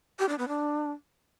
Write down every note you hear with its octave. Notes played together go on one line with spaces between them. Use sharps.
G4
D4
B3
D4